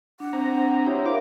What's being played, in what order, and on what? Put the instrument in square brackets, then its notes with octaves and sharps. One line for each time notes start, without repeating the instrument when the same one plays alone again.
[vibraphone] D4 [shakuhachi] F#5
[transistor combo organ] C4 A#5
[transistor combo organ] E4 G4 C5 [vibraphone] C#5
[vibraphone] A#4 E5 F5 [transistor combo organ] D6